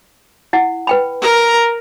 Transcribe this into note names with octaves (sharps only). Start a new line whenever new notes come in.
E4 F#5
B4 G5 B5
A#4 A#5